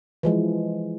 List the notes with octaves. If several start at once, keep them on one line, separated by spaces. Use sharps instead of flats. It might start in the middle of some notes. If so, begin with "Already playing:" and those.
E3 F3 G#3